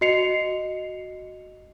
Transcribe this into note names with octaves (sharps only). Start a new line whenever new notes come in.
F#4 D#5 C7 C#7 F7